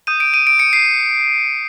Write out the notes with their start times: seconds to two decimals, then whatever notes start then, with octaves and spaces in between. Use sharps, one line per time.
0.07 D#6 G6 D#7
0.20 D7
0.34 D#7
0.47 D7
0.59 C#7
0.73 C7